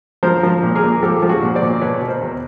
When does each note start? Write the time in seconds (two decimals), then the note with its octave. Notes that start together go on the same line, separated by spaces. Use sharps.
0.23 F3 A#4 C5
0.43 F3
0.63 A#2
0.75 G#4 A#4
0.83 A#2
1.03 F3 G4 A4
1.22 F3
1.29 F#4 G#4
1.43 A#2
1.55 C5 D5
1.62 A#2
1.81 B2 B4 C#5
2.01 B2
2.07 A#4 C5
2.22 E2